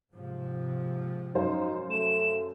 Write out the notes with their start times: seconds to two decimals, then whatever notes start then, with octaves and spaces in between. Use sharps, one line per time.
0.13 G#2 C3 F3
1.35 F#2 D#4 C5 F5
1.90 A3 E7